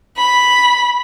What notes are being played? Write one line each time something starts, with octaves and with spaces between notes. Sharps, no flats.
B5